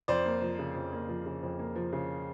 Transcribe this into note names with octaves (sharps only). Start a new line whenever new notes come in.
F2 C5 D5
A#3
F3
C#3
F2
A#3
F3
C#3
F2
A#3
F3
C#3